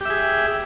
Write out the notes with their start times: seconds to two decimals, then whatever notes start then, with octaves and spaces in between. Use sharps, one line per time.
0.01 G4
0.05 E5
0.10 G#4